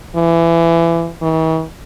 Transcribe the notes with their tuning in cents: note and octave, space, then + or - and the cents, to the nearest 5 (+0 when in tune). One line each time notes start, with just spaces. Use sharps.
E3 +25
E3 -45